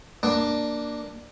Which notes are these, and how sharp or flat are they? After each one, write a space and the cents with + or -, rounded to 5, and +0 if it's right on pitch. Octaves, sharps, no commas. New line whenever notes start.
A#3 +0 D4 +10